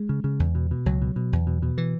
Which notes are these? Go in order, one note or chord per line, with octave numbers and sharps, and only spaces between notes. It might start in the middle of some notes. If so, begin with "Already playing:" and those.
Already playing: G#3
C#3
C#3
E2
B2
B2
C#2 F#3
B2
B2
E2
B2
B2
E3